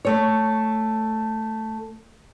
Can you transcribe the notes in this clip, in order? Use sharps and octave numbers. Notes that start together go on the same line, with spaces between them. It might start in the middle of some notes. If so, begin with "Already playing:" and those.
A3 C#5